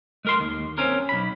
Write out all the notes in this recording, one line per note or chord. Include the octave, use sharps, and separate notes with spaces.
G#3 A#4 C6
D#2
C4 C#4 A#4
B1 B5